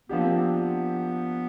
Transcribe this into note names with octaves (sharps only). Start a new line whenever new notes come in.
F3 A#3 B3 D4 G4
C4
B3